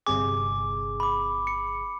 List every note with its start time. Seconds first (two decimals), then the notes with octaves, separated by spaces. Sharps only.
0.07 G1 C3 G#4 D6
1.00 B5 D6
1.47 C#7